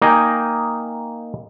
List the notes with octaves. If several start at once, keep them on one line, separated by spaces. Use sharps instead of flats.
A#3 D#4 D#5 G5 G#5